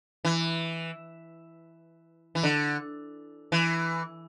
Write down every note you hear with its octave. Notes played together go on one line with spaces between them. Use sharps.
E3
E3
D3
E3